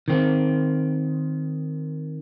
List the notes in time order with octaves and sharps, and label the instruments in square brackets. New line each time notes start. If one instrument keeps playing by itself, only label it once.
[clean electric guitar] D#3 C4